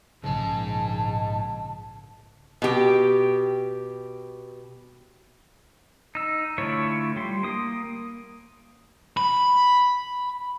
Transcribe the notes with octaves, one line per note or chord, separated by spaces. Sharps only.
A#1 G#2 C#3 G#4 A5
B2 G4
D#4 E6
D3 A3 E4 F4 C#5
G3 C6
A#3 D#6
B5